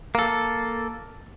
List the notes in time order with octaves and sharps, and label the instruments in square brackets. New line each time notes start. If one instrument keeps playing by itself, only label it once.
[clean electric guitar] A#3 A4